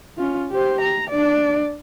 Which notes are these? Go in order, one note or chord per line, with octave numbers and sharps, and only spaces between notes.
C#4 F4
G4 C5
A#5
D4 D5